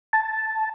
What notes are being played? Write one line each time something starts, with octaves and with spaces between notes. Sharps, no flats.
A5